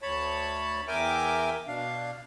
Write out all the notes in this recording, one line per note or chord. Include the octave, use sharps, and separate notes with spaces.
D2 C#5 A5 B5
E2 A#4 E5 G5 G#5 D6
B2 D4 F5